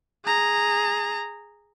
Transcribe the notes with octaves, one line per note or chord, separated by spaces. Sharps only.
G#4 A#5